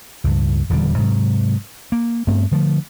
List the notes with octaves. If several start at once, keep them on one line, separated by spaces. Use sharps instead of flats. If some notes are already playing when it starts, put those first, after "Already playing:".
C#2 G2
D#1 E2 D3 G3
G#2 C3 F#3
A#3
G2 A3 B3 C4
D3 F3 G#3 A3